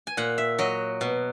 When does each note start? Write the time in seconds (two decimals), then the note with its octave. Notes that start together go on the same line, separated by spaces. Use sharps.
0.07 G#5
0.17 A#2 F#5
0.38 E5
0.59 F#3 D#5
1.01 B2